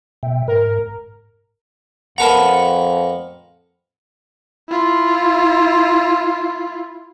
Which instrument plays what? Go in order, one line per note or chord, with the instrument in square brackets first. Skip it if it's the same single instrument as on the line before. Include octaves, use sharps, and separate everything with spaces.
[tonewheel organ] B2 E5 G5
[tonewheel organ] G#2 [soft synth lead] A#4
[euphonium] F2 [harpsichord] A#4 B4 A#5 [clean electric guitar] F#5 A5
[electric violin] E4 F4